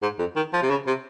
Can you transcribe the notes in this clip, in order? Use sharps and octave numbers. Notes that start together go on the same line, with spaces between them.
G#2
F2
D#3
F3
C3
C#3
C3